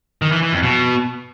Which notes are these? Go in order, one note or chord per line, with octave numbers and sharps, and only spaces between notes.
D#3
E3
E3
F2
B2